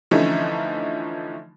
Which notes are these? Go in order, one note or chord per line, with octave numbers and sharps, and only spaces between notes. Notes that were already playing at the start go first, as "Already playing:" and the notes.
D3 E3 F3 A3 C#4 D#4